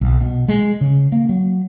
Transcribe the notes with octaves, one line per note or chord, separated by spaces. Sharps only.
B1
B2
G#3
C#3
A#3
F#3